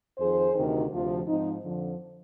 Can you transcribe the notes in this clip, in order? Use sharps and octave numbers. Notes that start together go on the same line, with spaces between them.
F2 D#3 G#4 C5
D2 C3 D#3
D2 C3 F3
G#2 F3 C4 D#4
F2 D3 F3